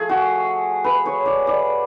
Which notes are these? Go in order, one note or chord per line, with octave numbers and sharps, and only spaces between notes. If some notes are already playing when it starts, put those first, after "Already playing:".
Already playing: F3 A3 G#4
F#4
B4
C#5
D5
D5